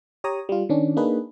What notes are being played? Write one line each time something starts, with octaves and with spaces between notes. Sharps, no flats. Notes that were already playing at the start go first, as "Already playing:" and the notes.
G4 C#5 A#5 D#6
G3 F4
D#3 C#4 D4
A#3 D4 D#4 G#4 B4